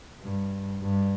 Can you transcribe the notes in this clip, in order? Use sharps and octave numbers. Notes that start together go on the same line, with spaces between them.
G2
G2